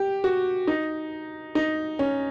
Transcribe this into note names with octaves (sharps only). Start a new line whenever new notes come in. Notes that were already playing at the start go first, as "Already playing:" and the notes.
Already playing: G4
F#4
D#4
D#4
C#4